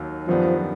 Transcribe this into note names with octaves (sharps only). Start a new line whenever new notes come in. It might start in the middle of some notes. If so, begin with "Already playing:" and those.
Already playing: D#2 D#3 F#3
F#2 D#3 F3 G3 B3 D4